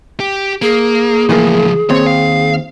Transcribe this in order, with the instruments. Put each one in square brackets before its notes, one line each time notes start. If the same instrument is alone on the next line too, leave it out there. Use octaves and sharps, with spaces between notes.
[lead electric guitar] G4
[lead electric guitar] A#3 [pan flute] G#4
[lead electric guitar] C#2 F3 [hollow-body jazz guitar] A2 E3 A#3
[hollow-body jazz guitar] D#2 C4 [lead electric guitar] C#5
[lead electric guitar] F5